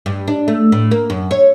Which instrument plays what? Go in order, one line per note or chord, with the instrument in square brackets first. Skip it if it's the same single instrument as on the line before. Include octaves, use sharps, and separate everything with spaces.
[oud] G2
D4
A3
A2
A#3
F#2
C#5